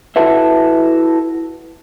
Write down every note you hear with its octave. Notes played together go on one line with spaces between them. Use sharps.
E4 F#4 A4 B4 E5